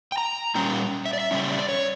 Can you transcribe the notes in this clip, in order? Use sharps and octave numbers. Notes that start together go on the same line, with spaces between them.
G5
A#5
A#2 G3 C#4 G5
E5
D5
E5
C#3 G3 C#4 E5
D5
C#5